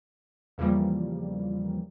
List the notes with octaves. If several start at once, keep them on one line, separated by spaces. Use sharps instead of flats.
E2 C#3 E3 F3 G3 A#3